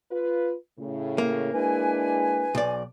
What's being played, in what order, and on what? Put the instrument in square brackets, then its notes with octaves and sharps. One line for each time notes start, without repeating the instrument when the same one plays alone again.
[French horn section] F4 B4
A2 C#3
[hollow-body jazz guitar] A#3
[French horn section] G#3 D4 E4 [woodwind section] B4 G#5
[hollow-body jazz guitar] B1 D5